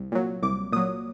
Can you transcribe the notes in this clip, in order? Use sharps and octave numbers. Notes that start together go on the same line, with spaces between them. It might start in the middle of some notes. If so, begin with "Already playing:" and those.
Already playing: C2
A#2 F#3
C2 D6
A#2 F#3 D#6